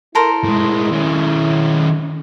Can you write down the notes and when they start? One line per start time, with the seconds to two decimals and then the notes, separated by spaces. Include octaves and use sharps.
0.15 E4 A4 A#4 C5
0.44 A2 G#3
0.92 D#3 C#4